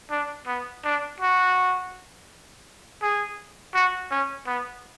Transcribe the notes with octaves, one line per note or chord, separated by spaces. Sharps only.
D4
B3
D4
F#4
G#4
F#4
C#4
B3